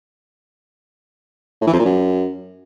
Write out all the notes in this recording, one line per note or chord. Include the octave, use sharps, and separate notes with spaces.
A2
E3
F2
A#2
F#2